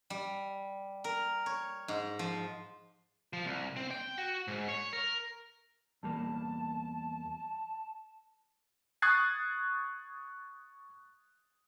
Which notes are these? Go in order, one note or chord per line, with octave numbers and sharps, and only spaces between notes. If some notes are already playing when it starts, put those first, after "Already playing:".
G3
A#4
C#5
G#2
F3
F3
C2
C4
G5
F#4
G#2
C#5
A#4
E2 G3 A#3 A5
C#6 D#6 F#6 G#6 A6 C7